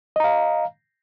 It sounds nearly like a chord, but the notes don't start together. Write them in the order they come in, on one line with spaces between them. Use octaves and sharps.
D#5 A#5 F5